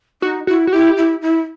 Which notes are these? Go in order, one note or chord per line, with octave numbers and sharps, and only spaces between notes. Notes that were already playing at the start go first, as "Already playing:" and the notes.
D#4 F#4
E4 F#4
F#4
E4 G4
E4
E4